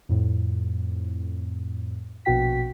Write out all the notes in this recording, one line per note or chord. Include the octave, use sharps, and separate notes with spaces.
F2 A2
A#1 B2 F#4 G5 B6